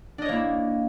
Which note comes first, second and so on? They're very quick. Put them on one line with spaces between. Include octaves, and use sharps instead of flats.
D4 D#5 C#5 A#3 E4